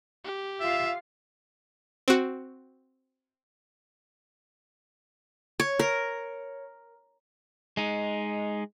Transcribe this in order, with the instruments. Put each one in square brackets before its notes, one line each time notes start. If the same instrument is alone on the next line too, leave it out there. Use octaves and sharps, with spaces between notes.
[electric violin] G4
[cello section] F4 F5 [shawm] E5
[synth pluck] C4 F#4
[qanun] C#5
A#4
[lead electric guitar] G#3 D#4